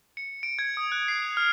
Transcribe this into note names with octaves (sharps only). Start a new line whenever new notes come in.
C#7
D7
G#6
D#6
F#6
C7
F7
F6